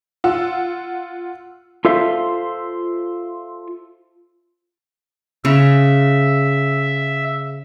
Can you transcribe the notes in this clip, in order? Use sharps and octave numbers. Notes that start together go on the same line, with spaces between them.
F4 F#5 E6
F4 A4 C5 E5 F5
C#3 E5